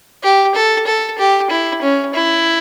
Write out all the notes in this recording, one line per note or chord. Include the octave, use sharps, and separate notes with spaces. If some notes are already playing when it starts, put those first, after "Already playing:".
G4
A4
A4
G4
E4
C#4
E4